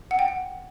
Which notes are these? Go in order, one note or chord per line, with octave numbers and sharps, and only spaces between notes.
F#5
G5
F#5